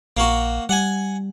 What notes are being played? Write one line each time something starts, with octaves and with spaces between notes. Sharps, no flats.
A#1 A#3 F#4
G3 F#5 G#5